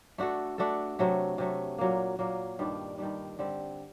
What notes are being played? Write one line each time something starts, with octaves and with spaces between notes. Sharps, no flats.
A3 D4 F#4 A4
A3 D4 F#4 A4
C3 F#3 A3
C3 F#3 A3
A#2 F#3 A#3
A#2 F#3 A#3
G2 D#3 G3 D4
G2 D#3 G3 D4
D3 G3 C4